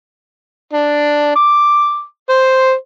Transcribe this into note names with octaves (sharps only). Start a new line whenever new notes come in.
D4
D6
C5